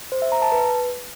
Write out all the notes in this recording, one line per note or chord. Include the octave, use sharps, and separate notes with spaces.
C5
E5
A#5
A5
B4